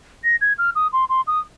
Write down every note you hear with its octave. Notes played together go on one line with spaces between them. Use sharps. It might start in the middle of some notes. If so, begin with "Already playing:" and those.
A#6
G#6
F6
D#6
C6
C6
D#6